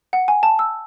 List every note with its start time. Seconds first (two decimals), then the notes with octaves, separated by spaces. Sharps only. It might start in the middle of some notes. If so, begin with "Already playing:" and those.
0.13 F#5
0.28 G#5
0.43 A5
0.59 E6